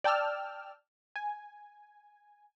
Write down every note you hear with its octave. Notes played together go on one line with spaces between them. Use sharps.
D5 G5 A5 E6 F6
G#5